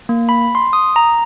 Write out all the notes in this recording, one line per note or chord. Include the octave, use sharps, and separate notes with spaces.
A#3
B5
C6
D#6
A#5